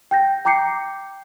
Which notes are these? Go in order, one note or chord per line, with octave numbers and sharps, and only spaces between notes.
G5 G6 A#6
G5 A#5 D6 G6 C7 C#7